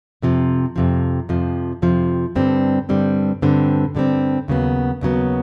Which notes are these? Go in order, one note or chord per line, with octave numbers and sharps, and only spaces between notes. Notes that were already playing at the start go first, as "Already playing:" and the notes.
F2 C3 F3
F2 C3 F3
F2 C3 F3
F2 C3 F3
G2 D3 G3 C4
G2 D3 G3 C4
G2 D3 G3 C4
G2 D3 G3 C4
D#2 C#3 F#3 B3
D#2 C#3 F#3 B3